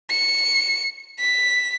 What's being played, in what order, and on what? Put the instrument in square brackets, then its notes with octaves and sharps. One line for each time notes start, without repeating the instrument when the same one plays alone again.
[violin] C#7
B6